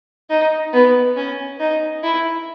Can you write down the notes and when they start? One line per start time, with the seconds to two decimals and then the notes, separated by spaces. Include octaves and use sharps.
0.30 D#4
0.73 B3
1.16 C#4
1.60 D#4
2.03 E4